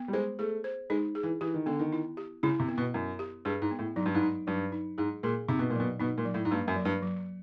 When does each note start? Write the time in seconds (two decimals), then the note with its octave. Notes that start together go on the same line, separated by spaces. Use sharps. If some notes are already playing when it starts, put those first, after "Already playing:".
Already playing: B3
0.08 G3
0.13 G#3 C5
0.39 A3 G#4
0.64 C5
0.90 G#3 D#4
1.15 G#4
1.23 E3
1.41 E3 G4
1.54 D#3
1.66 D3 B3
1.79 D#3
1.92 E4
2.17 G4
2.43 C#3 E4
2.60 C3
2.69 B3
2.78 B2
2.94 F#2 E4
3.19 G4
3.45 G2 G#4
3.62 G#2
3.71 B3
3.79 A2
3.96 G#2 F#3
4.06 G2
4.15 G#2
4.22 D#4
4.47 G2 F#3
4.72 D#4
4.98 G#2 G#4
5.23 A#2 G#4
5.49 C3 D#4
5.59 B2
5.70 A#2 F#3
5.80 B2
6.00 B2 D#4
6.18 A#2
6.25 F#3
6.34 A2
6.45 G#2
6.51 G2 A#3
6.68 F#2
6.76 F#3
6.85 G2
7.02 F#3